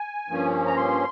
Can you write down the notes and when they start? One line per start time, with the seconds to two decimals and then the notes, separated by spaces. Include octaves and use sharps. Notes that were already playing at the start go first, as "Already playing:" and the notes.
Already playing: G#5
0.28 G2 F3 A#3 C#4
0.66 A#5
0.76 C6